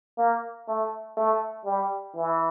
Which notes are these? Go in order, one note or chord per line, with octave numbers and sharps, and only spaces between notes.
A#3
A3
A3
G3
E3